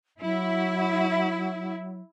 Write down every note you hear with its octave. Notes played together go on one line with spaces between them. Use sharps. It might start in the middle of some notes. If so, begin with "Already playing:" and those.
F#3 E4